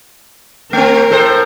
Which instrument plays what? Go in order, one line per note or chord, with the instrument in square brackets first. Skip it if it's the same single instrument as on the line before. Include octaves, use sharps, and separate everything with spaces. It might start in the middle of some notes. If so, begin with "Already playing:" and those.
[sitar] A3 C4 [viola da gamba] A#4
[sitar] A2 A4 C5